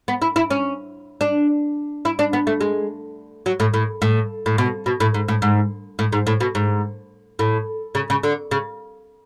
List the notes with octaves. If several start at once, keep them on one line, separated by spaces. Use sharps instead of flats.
B3
E4
E4
C#4
D4
E4
D4
B3
A3
G#3
F#3
A2
A2
A2
A2
B2
B2
A2
G#2
A2
G#2
A2
G#2
A2
B2
G#2
A2
C#3
C#3
D3
C#3